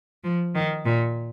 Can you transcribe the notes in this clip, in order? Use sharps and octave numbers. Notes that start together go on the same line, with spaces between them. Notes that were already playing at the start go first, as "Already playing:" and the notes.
F3
D#3
A#2